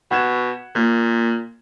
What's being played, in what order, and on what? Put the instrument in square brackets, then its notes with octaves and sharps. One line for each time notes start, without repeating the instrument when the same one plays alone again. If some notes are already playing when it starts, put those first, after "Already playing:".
[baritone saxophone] B2 [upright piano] F#5 G#6 E7
[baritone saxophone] A#2 [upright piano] A#3